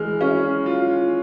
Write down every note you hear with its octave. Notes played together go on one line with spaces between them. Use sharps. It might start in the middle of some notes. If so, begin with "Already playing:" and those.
Already playing: E3 G#3 F6
C#4
F4